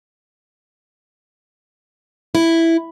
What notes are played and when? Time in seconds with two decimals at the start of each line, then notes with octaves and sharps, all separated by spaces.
2.35 E4